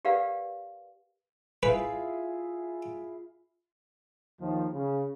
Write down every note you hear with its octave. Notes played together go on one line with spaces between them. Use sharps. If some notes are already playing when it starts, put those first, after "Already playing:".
G4 A#4 B4 D5 F5 F#5
E4 F4 G#4 B4
D#2 D#3 F3
C#3